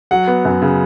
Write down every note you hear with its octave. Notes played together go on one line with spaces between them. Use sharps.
F#3 F#5
B3
F#2
C#3